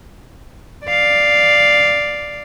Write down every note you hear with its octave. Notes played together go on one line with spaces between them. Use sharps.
D5 F5